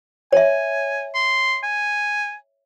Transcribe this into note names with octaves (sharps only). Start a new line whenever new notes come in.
C#5 E5 G#5
C6
G#5